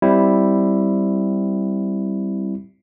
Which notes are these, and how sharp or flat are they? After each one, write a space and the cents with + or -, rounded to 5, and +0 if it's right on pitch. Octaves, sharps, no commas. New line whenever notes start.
G3 +0 C4 +0 E4 +0